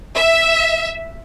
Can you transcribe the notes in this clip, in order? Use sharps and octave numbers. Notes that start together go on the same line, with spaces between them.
E5